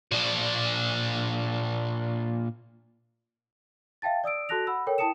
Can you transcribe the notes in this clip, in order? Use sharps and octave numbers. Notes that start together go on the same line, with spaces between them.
A#2 D4
E5 F5 G5 A5 A6
D5 D#6 E6 D7
F#4 A4 A5 F#6 A#6 F7
F#5 B5 E6
A4 A#4 C#5 G5
E4 G5 A5 D#6 C#7 E7